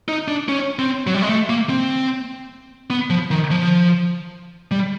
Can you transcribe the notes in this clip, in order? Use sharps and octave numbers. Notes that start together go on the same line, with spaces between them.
D#4
D4
C#4
C4
F#3
G3
G#3
A3
A#3
C4
B3
F3
D#3
F3
G3